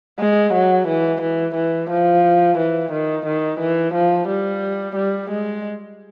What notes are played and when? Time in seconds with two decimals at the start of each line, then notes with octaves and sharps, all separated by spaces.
0.20 G#3
0.54 F#3
0.87 E3
1.21 E3
1.55 E3
1.90 F3
2.58 E3
2.92 D#3
3.26 D#3
3.60 E3
3.94 F3
4.28 G3
4.96 G3
5.30 G#3